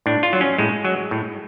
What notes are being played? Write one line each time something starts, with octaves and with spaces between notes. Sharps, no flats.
A2 D4
F4
F#3
C#4
A2 G#3
F#3
A2